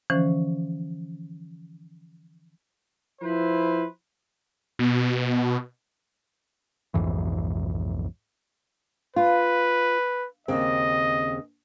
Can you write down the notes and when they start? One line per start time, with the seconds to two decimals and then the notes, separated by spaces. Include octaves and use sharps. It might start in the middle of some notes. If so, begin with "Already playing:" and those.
0.10 D3 E3 F3 C#4 C5
3.22 F3 E4 B4 C5
4.79 B2
6.94 B1 F2 G#2 E3
9.16 F4 B4
10.48 D#2 C#3 C4 D#5